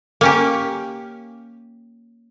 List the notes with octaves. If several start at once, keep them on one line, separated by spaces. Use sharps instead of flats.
A#3 C#4 G4